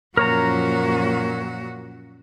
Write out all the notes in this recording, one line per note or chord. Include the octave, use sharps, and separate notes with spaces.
F#2 A#2 F3 C#4 F#4 A#4 C#5 A#5